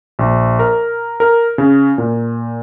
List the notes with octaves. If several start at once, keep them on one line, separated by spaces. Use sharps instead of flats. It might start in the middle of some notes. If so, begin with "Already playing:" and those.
A#1
A#4
A#4
C#3
A#2